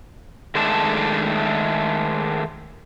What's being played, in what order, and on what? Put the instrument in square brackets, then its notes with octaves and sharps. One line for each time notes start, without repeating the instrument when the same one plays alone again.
[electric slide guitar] D#3 G#3 A3 D4 A4 A5